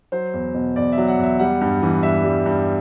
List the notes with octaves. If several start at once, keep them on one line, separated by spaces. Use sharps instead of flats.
F#3 C5
E2
B2
E2 D5
E5
F#3
F#5
E2
E5
G3 F#5
G2
E3
G2 E5
G3
G2